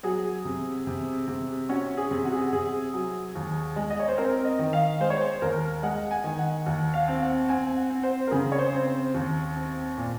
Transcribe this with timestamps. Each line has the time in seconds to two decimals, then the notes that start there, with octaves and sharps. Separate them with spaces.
0.03 F#3 G#4
0.45 C3
0.87 C3
1.28 C3
1.69 C#4 F#4
1.97 G#4
2.11 C3
2.25 F#4
2.33 G#4
2.41 F#4
2.53 C3 G#4
2.94 F#3
3.35 D#2
3.76 G#3
3.91 D#5
3.99 C#5
4.08 C5
4.17 C4 A#4
4.45 D#5
4.59 D#3
4.73 F5
5.00 G#3 C5
5.10 C#5
5.21 C5
5.42 D#2 A#4
5.83 G#3 F#5
6.11 G#5
6.24 D#3
6.39 F#5
6.66 D#2 F#5
6.94 F5
7.08 C4
7.22 F#5
7.49 C4 G#5
7.77 F#5
7.90 C4
8.03 C5
8.27 A#4
8.31 C#3 G#4
8.52 C#5
8.59 C5
8.73 C4
8.87 C5
9.14 D#2
9.56 C4
9.97 A#2